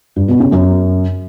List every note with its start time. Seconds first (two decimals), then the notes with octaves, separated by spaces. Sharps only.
0.16 G2
0.28 B2
0.40 C#3
0.52 F#2